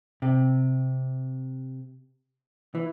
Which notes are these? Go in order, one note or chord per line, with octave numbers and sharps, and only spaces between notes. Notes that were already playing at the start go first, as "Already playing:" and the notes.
C3
E3